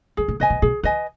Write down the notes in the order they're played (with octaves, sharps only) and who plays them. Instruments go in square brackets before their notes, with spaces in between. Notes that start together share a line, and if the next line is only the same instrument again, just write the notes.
[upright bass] G#2 [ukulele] G#4
[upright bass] A#2
[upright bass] B2 [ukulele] B4 D#5 G#5
[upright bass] B2
[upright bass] B2 [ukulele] G#4
[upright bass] D#3 [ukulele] B4 D#5 G#5